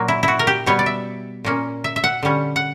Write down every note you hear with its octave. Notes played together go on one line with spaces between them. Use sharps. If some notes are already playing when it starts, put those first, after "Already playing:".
Already playing: A#2 F#3 A#3
E4
E4
F#4
A#4
G4
B2 G3 B3 C#5
D5
E5
A#2 A#3 C#4
E5
E5
F#5
D3 G3 C#4
F#5